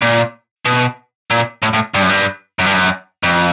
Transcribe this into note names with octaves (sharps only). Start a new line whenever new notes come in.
A#2
B2
A#2
A2
A2
G2
F#2
G2
F#2
G2
F#2
F2